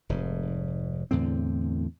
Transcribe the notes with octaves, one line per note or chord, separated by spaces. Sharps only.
F1 G#2
E2 A2 D3 C4